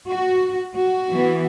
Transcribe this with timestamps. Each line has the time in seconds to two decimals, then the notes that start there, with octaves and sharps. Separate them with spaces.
0.08 F#4
0.76 F#4
1.09 E3 B3